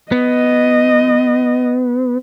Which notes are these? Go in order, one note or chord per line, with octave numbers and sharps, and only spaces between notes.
B3 D#5